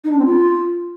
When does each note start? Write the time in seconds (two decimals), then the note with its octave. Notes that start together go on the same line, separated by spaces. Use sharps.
0.04 D#4
0.11 D4
0.18 C4
0.25 F4